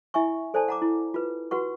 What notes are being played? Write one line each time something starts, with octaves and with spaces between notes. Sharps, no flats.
E4 E5 G#5 C#6
A4 C5 D5 G#5 A5
F#5 A#5 D6
E4
F4 B4
F#4 B4 F#5 C#6